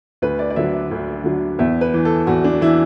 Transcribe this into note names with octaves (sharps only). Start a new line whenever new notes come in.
D2 B4
D5
D5
D3 F#3 E5
E5
D2
D3 F#3
E2 E5
B4
E3
A4
E2 F#4
D4
E3 E4